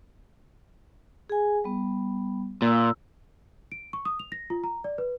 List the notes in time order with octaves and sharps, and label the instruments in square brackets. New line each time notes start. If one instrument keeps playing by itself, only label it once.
[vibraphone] G#4 G#5
G3 B3
[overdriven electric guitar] A#2 [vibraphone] A#3 E6
[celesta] D7
C#6
D#6
F7
A#6
F4
A#5
D5
B4